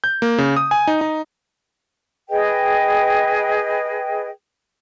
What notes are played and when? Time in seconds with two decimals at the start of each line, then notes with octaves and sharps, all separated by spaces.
0.04 G6
0.22 A#3
0.38 C#3
0.57 D#6
0.71 G#5
0.87 D#4
1.01 D#4
2.30 G#4 B4 D#5 G5